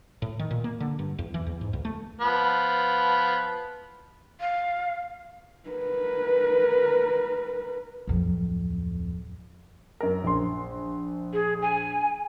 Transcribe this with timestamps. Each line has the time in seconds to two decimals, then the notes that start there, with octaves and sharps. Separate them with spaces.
0.22 A2
0.39 D#3
0.51 A#2
0.64 A#3
0.80 D3
0.99 G2
1.19 E2
1.34 E3
1.47 E2
1.61 G#2
1.73 C#2
1.85 A3
2.21 F3 B3
4.40 F5
5.69 A#4 B4
8.07 D1 F2
10.00 F#2 A#4
10.24 A#1 C6
11.33 G#4
11.62 G#5